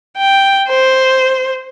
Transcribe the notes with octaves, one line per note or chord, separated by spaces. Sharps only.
G5
C5